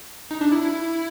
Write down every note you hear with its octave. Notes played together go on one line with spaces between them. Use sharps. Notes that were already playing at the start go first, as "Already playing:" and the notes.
D#4
D4
E4
E4